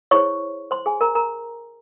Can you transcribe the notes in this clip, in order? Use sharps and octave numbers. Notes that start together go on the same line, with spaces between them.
E4 G#4 C5 C#5 C#6
C5 C6
G#4 G#5
A#4 A#5
A#4 A#5